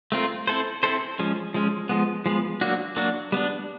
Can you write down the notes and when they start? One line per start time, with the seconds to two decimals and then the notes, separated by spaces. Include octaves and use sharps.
0.12 A3 C4 F4 A#4
0.47 C4 E4 A4 C5
0.83 C4 E4 A4 C5
1.19 F3 G#3 C#4
1.54 F3 G#3 C#4
1.89 F3 G#3 B3
2.26 F3 G#3 B3
2.61 F#3 A#3 D4 F#4
2.96 F#3 A#3 D4 F#4
3.32 G3 B3 D4